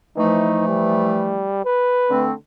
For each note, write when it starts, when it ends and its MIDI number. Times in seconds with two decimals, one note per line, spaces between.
0.17 1.48 52
0.17 1.48 53
0.17 1.48 57
0.17 0.64 63
0.68 1.61 55
1.65 2.25 71
2.09 2.32 50
2.09 2.32 57
2.09 2.32 60